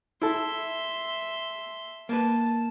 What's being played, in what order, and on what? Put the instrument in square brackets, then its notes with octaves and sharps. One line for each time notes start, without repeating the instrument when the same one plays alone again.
[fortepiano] E4 A4 [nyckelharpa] E5 C6
[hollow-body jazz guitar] A#3 B4 [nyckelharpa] A5